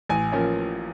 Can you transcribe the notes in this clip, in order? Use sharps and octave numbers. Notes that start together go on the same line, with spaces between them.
A1 G#5
F3 A#3 C#4